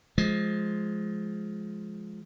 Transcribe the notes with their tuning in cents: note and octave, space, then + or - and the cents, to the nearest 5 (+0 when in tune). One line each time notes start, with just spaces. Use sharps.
F3 +0 G#3 +15